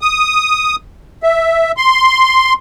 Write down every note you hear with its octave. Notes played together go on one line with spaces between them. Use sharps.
D#6
E5
C6